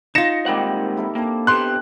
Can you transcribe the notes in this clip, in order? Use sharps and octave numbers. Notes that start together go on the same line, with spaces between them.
D#4 F4 A#6 C#7 E7
D#3 G3 G#3 A#3 C4 F#5
E4 A4 A#4
A#3 C4 D4 A5
B3 G4 A4 C6 F#6